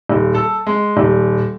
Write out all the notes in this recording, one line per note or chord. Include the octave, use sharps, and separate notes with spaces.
D#1
A4
G#3
D#1